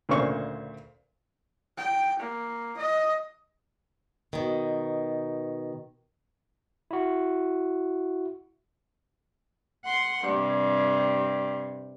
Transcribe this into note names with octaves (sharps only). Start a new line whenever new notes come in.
D2 A#2 C#3 C5 C#6
G5
A#3
D#5
B2 D#3
E4 F#4
F#5 C6
G2 C3